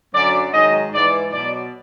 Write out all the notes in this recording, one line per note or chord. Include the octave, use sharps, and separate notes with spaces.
F#2 D3 F#3 D5
G#2 D#3 F#3 D#5
G#2 E3 D5
B2 F#3 D5